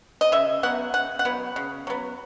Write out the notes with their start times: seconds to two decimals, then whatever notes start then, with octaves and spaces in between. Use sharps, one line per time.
0.21 D#5
0.32 C#3 E5
0.63 F#3 B3 F#5
0.94 C#3 F#5
1.19 F#5
1.25 F#3 B3
1.56 C#3
1.87 F#3 B3